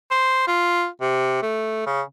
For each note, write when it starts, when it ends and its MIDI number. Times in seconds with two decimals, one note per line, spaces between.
0.11 0.45 72
0.47 0.86 65
1.01 1.39 48
1.42 1.83 57
1.86 2.01 49